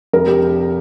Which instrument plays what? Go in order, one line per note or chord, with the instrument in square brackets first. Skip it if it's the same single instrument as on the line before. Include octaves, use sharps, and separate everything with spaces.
[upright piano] F1 [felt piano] A#4
[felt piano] G4